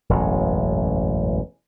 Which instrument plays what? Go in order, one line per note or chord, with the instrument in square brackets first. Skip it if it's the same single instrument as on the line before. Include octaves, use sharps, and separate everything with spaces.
[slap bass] E1 A1 F#2 F#3